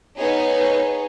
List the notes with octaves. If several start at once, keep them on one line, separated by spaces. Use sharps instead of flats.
B3 D#4 G#4 C#5